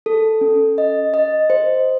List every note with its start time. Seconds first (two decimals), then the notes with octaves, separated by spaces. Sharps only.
0.06 A4
0.41 C#4
0.78 D#5
1.14 D#5
1.50 C5